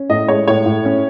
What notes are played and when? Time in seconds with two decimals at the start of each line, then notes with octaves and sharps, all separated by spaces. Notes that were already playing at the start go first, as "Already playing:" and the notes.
Already playing: C#4
0.09 A2 D#5
0.28 G#3 C#5
0.48 A2 C#5
0.66 A2
0.85 C#4